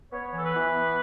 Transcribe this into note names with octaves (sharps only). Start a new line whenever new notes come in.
B3 C#5
E3 A4
B4
E3
B3